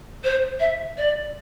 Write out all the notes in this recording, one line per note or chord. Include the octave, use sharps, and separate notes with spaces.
C5
E5
D5